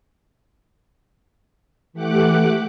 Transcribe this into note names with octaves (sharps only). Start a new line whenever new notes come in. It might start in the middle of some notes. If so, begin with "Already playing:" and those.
E3 A3 G4 F#5 D6 F#6